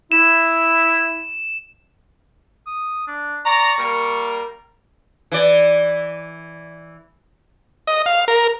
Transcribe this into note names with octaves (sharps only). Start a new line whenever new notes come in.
E4 E7
D#6
D4
D5 A#5 C#6
G3 A#3 A#4
E3 D5
D#5
F5
A#4